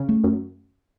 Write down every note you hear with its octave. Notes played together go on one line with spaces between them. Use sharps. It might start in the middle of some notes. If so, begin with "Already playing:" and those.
Already playing: C#3
A3
F#2